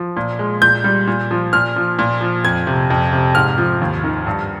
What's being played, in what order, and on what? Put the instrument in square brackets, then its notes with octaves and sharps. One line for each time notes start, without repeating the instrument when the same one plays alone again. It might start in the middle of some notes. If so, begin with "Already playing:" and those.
Already playing: [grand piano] F3
A#2
G#3
A#2 G6
G3
A#2
F3
A#2 F6
F3
A#2
F3
F2 G#6
C3
F2
C3
G#2 F6
F3
D#2
D#3
G2